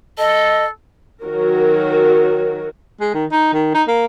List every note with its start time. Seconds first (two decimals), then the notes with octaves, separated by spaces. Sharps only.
0.18 A4 D#5
1.24 D#3 F#3 F#4 A#4
3.01 G#3
3.14 D#3
3.32 D#4
3.53 D#3
3.74 D#4
3.88 A#3